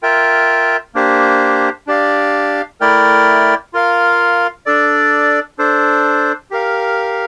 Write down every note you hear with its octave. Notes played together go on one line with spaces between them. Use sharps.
F4 A#4 E5 G5
A#3 D4 G4 C5
D4 G4 D5 F5
A3 E4 A#4 D5 G5
F4 A#4 F5
D4 A4 D5
D4 A4 C5
G4 A#4 F5